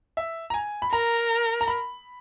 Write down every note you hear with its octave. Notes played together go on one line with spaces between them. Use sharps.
E5
A#5
G#5
B5
A#4 A#5
A#5
B5